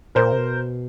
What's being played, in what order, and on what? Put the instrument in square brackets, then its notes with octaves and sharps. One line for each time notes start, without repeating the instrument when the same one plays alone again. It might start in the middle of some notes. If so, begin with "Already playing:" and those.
[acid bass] A#2 [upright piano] A#4 C5
[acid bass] C3
B2